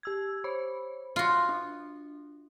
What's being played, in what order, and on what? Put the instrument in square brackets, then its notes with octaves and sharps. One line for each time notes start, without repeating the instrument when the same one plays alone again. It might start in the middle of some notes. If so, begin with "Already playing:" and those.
[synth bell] G4 E6 G#6
C5 C#5 B5
[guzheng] F4 F#4
[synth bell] D4